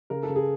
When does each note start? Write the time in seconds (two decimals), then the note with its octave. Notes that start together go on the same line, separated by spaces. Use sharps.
0.10 C#3 A#4
0.23 A4
0.29 C#3
0.36 G#4